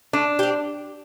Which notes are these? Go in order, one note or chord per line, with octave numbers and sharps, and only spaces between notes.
A3 D4
C4 G4